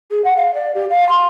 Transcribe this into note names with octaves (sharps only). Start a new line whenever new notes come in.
G#4
F#5
F5
D5
G4
F5
C6